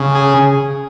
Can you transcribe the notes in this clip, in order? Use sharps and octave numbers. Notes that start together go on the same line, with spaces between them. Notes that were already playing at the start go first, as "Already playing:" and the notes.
Already playing: C#3
G#4